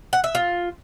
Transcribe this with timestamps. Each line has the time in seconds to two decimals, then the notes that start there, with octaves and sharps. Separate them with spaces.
0.13 F#5
0.24 E5
0.35 F4